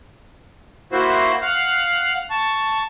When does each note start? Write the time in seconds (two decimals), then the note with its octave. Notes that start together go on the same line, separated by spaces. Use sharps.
0.92 A#3 E4 F#4 C5
1.42 F5 F#5
2.30 A5 C#6